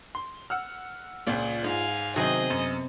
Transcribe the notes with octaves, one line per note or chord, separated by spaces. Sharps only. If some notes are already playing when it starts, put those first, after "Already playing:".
C6
F#5 E6 F6
C#2 A#2 F4 G#4 D5
G#2 F5 G#5
C3 D#3 F#3 B3 C4 G#4 D#5
F#2